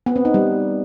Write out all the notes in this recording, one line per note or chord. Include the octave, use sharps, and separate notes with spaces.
B3
C4
D#4
G3